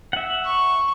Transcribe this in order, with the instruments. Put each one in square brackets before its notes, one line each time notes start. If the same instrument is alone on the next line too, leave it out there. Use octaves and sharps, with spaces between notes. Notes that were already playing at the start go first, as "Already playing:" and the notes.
[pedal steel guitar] E5 F#5
[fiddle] C#6